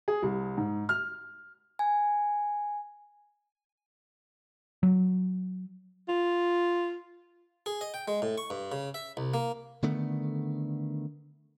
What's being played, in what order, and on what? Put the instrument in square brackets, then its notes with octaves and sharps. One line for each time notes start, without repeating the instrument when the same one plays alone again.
[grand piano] G#4
C2
G#2
F6
[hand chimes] G#5
[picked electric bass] F#3
[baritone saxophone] F4
[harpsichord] G#4
D#5
G5
G#3
A2
C#6
G2
C#3
E5
C2
A#3
[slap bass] D3 D#3 A3 B3